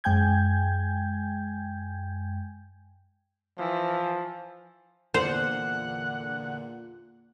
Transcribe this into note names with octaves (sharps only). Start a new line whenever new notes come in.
F#2 G#3 G5 G#5 G6 G#6
E3 F3
E2 A#2 D3 C5 F#5